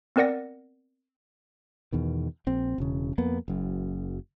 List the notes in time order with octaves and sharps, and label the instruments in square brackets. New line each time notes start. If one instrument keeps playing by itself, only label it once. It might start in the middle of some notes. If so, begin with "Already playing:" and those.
[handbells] B3 C4 A#4 D5 F#5 A#6
[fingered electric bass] E2 B2 D#3
A#1 C4
E1 C#3
F2 A#3 B3
F#1 F#2